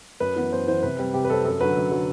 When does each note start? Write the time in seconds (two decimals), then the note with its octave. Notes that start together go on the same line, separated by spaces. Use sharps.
0.20 F#2 B4
0.36 E3 B3
0.52 F#2 C5
0.67 E3 B3 C5
0.83 C3 B4
0.99 G3 C4
1.14 C3 G4
1.25 B4
1.30 G3 C4 A4
1.45 F#2 A4
1.61 D3 F#3 B4
1.77 F#2
1.91 D3 F#3